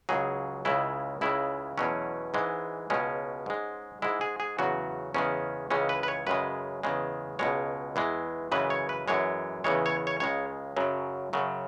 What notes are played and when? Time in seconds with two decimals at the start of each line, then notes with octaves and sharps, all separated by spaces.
0.09 C#2 C#3 F#3 G#4
0.65 C#2 C#3 G#3 E4
1.21 C#2 C#3 G#3 E4
1.78 E2 B2 F#3 C#4
2.34 G#2 E3 G#3
2.90 C#2 B2 G#3 C#4
3.46 G#2 G#3
4.02 G#2 G#3 E4
4.21 G#4
4.40 G#4
4.59 E2 C#3 F#3 F#4
5.15 E2 C#3 G#3 C#4
5.71 C#2 C#3 E3 G#3 C#4
5.89 B4
6.03 B4
6.08 C#5
6.27 F#2 C#3 G#3 B4
6.83 E2 C#3 G#3
7.39 C#2 B2 G#3 C#5
7.96 E2 E3 G#3
8.52 F#2 C#3 E3 G#3 B4
8.70 C#5
8.89 B4
9.08 F#2 E3 G#3 C#5
9.64 E2 C#3 E3 G#3 C#5
9.86 C#5
10.07 C#5
10.20 C#2 C#3 G#3 C#5
10.77 F#2 C#3 F#3
11.33 F#2 C#3 F#3